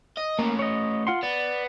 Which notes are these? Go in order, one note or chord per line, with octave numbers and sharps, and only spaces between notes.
D#5
A3 A#3 C#4
C#5 D#5
F4 F#5 C6
B3 D5